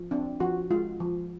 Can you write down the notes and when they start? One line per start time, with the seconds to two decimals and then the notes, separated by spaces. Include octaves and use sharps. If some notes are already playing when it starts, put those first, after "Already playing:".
Already playing: F3
0.11 C4 D4
0.40 F3 F#4
0.71 G#3 F4
1.00 F3